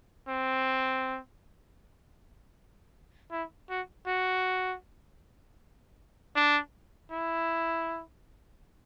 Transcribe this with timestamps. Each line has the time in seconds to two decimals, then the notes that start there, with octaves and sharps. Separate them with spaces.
0.28 C4
3.32 E4
3.70 F#4
4.07 F#4
6.36 D4
7.11 E4